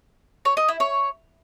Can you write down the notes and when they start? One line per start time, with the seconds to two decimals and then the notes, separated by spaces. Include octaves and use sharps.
0.45 C#5
0.57 D#5
0.68 E4
0.80 C#5